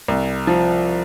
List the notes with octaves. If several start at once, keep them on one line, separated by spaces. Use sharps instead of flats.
C2
F3